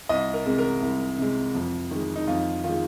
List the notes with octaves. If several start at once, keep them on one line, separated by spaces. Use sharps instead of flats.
C2 D#5
A#4
C3 G#3
A#4
C2
C3 G#3
F2
D#3 G#3
D#4
F2 F4
D#3 F4
G#3